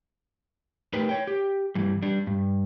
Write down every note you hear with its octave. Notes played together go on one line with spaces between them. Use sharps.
A3 D#4 G4 A#4 B4
C#5 G5
G4
G2 E3 G3
G3 D4
G2